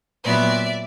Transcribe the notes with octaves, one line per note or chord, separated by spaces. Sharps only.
A#2 F#3 B3 D5 E5